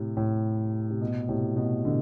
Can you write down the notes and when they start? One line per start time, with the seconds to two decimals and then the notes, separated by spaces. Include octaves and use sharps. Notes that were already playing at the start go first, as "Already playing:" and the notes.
Already playing: A2 C3
0.17 A2
0.90 C3
1.01 B2
1.29 A2 C3
1.56 B2
1.85 B2 D3